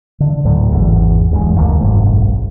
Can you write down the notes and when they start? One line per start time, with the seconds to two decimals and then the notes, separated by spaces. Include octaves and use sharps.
0.20 D3
0.45 D2 A2 F#3
0.72 G#1 E2
1.31 D1 E2 G2 G#3
1.56 F#1 D2 D#3 A3
1.81 F#1 B1 G#2